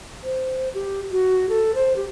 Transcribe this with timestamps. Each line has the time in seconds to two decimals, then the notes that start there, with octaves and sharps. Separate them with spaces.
0.23 C5
0.74 G4
1.12 F#4
1.49 A4
1.75 C5
1.96 G4